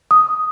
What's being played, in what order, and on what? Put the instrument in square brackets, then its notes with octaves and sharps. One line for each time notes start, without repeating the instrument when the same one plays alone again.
[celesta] D#6